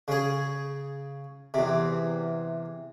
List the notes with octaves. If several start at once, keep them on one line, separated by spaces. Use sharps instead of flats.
C#3 G#4
E2 C3